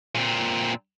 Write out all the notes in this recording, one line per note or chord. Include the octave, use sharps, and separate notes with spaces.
A#2 C4